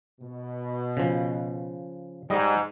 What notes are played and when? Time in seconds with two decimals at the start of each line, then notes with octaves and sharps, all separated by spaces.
0.21 B2
0.97 C#3 F3
2.30 G#2 G3 D#5